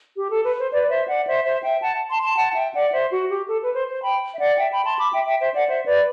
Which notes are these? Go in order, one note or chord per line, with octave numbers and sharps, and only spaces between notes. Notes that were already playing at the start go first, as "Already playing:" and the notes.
G4
A4
B4
C5
B4 D5
D5
C5 E5
D5 F#5
C5 E5
C5 E5
E5 G5
F#5 A5
A5 C6
A5 C6
F#5 A5
E5 G5
D5 F#5
C5 E5
F#4
G4
A4
B4
C5
C5
G5 B5
E5
D5 F#5
E5 G5
G5 B5
A5 C6
B5 D6
E5 G5
E5 G5
C5 E5
D5 F#5
C5 E5
B4 D5